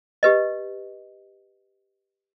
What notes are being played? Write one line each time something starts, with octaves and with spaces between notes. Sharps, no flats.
G4 B4 D#5